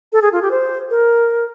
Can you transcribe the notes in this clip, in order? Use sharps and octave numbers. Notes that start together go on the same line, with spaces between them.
A4
G#4
F4
G4
C5
A#4